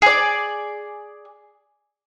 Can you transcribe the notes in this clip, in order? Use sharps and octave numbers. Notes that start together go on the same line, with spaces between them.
G#4 D5